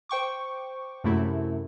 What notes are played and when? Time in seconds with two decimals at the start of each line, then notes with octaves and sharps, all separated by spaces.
0.09 C5 G5 C#6 D6
1.04 F#2 C3 A3 E4